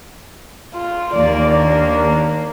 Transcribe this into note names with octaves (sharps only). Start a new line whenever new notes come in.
F4
D#2 A#3 D5
D4